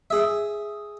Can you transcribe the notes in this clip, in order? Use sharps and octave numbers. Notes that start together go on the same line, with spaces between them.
G#4 E5